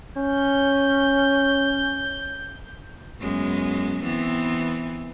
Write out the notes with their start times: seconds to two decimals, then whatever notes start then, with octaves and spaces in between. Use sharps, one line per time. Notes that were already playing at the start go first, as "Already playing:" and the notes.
0.17 C#4 G6
3.20 F#2 G#3 B3
4.04 E3 B3 C4